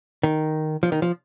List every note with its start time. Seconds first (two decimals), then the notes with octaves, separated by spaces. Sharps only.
0.23 D#3
0.83 F3
0.92 D#3
1.02 F3